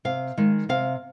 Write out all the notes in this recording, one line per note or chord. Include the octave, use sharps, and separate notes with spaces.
C3 F5
D#3 G#3
C3 F5